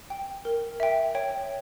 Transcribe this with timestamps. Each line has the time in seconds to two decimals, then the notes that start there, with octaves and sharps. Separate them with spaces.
0.10 G5
0.45 A#4
0.80 E5 G5
1.15 C#5 G5